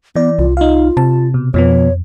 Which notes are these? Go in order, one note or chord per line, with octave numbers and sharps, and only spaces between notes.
E3 B3 D5
C2 F4
D#4 F4 F5
C3 A5
B2
F2 B2 F3 B3 C#5